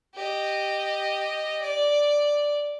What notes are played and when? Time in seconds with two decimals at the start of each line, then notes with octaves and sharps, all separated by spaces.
0.15 G4 D#5
1.62 D5